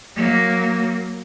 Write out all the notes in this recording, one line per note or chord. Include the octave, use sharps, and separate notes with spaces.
F#3 A#3